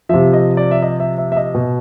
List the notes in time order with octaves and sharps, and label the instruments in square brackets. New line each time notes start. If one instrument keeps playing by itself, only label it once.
[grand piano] C3 F3 E5
D#5
D5
E5
D#5
E5
E5
E5
D#5
B2